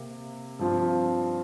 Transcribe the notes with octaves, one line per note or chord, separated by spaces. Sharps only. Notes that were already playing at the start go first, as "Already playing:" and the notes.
Already playing: C3 A#3
G2 F3 C4 F4